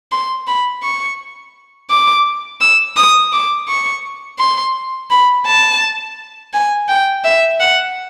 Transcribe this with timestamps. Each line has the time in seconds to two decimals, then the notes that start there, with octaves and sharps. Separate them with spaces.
0.12 C6
0.47 B5
0.83 C#6
1.90 D6
2.61 E6
2.97 D#6
3.32 D6
3.68 C#6
4.39 C6
5.10 B5
5.46 A5
6.53 G#5
6.89 G5
7.24 E5
7.60 F#5